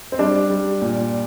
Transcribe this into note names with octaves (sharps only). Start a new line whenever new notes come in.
C4
G3 D4
G3
A#2